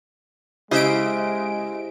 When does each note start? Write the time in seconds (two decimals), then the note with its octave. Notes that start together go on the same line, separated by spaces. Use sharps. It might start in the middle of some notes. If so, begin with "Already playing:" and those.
0.71 C#3 G#3 E4 G4 C5 D#5 E5 D7